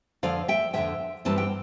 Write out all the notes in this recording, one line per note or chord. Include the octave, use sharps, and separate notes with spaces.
F2 D3 F3 D5 F5
E5 G5
F2 D3 F3 E5 G5
G2 E3 G3 C4 A5
G5